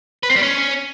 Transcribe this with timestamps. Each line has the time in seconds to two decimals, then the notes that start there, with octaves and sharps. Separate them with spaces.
0.23 B4
0.30 C4
0.36 G3
0.43 C#4